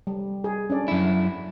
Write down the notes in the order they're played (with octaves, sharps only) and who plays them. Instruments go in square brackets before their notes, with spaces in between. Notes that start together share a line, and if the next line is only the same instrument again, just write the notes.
[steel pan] G3
G#4
C#4 D4 D5
[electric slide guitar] F#2 E4